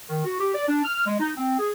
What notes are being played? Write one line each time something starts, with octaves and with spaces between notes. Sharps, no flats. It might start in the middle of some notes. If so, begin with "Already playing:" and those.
D#3
F#4
G4
D5
D4
F6
G#3
D#4
C4
G#4